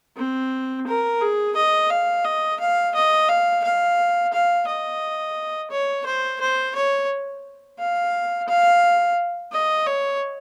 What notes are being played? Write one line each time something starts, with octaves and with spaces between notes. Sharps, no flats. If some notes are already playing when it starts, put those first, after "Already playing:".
C4
A#4
G#4
D#5
F5
D#5
F5
D#5
F5
F5
F5
D#5
C#5
C5
C5
C#5
F5
F5
D#5
C#5